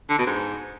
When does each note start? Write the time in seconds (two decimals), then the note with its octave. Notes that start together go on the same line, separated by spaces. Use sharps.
0.10 D3
0.18 B2
0.27 G#2